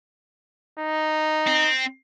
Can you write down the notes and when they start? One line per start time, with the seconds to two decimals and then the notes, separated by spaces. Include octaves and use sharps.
0.79 D#4
1.47 C4